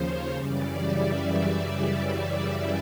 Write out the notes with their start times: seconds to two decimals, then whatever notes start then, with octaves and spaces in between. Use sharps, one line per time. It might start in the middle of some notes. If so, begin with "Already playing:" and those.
Already playing: D#2 C#3 F3 C5 C#5
0.34 F#2 C#3 E3 G3 D5
0.76 E5